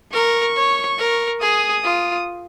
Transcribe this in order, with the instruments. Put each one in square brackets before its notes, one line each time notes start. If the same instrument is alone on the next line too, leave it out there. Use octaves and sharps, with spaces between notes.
[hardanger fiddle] A#4 [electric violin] C#6
[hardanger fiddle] C#5
A#4
[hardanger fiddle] G#4 [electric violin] D#6
[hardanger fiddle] F4